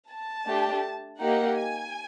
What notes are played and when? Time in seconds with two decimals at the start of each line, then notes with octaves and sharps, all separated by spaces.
0.08 A5
0.45 A3 D4 G4
1.20 A#3 D#4 G4 F#5
1.57 G#5